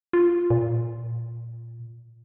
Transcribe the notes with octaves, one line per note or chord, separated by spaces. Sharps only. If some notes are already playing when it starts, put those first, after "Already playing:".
F4
A#2